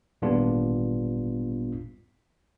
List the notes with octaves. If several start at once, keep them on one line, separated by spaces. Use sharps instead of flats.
G#1 A#2 G3 B3 D4 F4